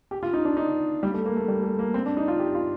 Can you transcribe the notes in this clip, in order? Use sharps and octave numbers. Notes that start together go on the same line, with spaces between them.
G4
F4
D#4
D4
D#4
G3
A3
A#3
A3
G3
A3
A#3
C4
D4
D#4
F4
G4
F4